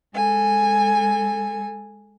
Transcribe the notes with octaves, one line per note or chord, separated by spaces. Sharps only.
G#3 A4 G#5